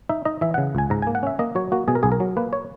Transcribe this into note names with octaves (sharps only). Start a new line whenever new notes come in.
D#4 E5
D#4 D#5
E3 E5
F#5
C#3
C#2 G#5
G#2 A#5
G#5
A#3
F#5
C#4 E5
A#3 D#5
F#3 C#5
A#3 F#4
B2 G#4
A#4
B1 G#4
A#4
F#3
A#3 B4
C#5